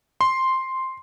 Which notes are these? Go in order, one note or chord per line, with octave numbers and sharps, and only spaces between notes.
C6